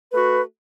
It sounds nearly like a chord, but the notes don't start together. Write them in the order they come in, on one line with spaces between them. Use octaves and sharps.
B4 A3 F#4